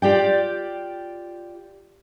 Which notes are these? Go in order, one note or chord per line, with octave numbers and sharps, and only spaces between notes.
F4 G4 D5 G5